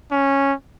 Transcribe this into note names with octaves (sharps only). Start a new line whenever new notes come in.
C#4